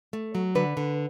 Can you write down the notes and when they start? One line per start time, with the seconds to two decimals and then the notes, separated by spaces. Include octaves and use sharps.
0.13 A3
0.35 F#3
0.55 D3 B4
0.77 D3